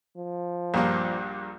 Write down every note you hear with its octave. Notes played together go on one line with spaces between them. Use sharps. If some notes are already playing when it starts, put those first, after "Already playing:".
F3
A#1 G2 A#3